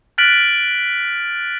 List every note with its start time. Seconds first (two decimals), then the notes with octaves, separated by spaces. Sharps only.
0.18 F6 F#6 A6 B6 D7 F#7